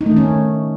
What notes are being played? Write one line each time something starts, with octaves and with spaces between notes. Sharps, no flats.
D#4
A3
D#3
C#4